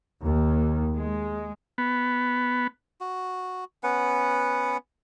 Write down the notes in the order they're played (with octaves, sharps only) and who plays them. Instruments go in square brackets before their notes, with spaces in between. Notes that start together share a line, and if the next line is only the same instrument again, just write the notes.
[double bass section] D#2
G#3
[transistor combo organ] B3
[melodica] F#4
B3 C#4 B4 F#5